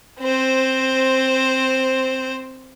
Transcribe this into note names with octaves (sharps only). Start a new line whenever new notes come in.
C4 C5